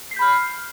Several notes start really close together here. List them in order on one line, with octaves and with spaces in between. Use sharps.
C7 B6 G6 B5 F6